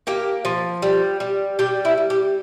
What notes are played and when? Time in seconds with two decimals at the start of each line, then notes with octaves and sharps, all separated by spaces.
0.07 A#3 G4
0.45 F3
0.82 G3
1.20 G3
1.59 G3 G4
1.85 E4
1.97 G3
2.10 G4